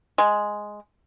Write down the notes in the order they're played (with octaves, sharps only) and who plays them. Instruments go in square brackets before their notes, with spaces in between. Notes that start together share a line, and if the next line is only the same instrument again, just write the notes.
[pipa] G#3